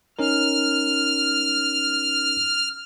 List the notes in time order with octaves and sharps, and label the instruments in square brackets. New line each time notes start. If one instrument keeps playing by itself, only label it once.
[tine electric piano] C#4 D#4 A#4 [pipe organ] F6